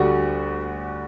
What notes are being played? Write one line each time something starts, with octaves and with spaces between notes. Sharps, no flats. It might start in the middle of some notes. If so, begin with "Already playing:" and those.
Already playing: D2 D3 G3 D4 F#4